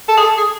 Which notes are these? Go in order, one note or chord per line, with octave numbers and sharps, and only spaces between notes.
A4
G#4
A4
G#4